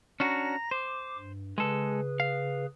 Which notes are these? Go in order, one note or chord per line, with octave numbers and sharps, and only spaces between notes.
C#4 D4 F#4 A#5 A#6
C5 D6
G2
C#3 G#3 G#4 A4 B4
F5